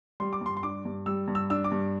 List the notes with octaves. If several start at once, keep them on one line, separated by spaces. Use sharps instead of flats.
G3 C6
D6
G2 C6
C6
D4 D6
G2
G3 E6
G2
E6
D4 E6
D6
G2